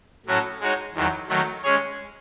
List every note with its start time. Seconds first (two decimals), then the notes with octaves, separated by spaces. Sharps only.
0.26 A2 F#3 C#4 F#4 A4
0.60 G#3 D#4 F#4 C#5
0.95 E2 D#3 F#3
1.29 D#3 F#3 A3
1.63 G#3 C#4 G#4 C#5